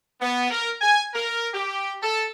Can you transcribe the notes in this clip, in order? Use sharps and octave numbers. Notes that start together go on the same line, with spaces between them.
B3
A#4
G#5
A#4
G4
A4